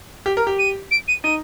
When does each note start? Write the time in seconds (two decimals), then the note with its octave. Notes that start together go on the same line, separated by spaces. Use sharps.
0.26 G4
0.37 A#4
0.47 G4
0.59 D#7
0.91 D7
1.08 D#7
1.24 D#4 D#7